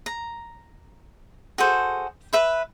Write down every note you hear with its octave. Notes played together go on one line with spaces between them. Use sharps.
A#5
F#4 G#4 A4 C5
B4 E5 B5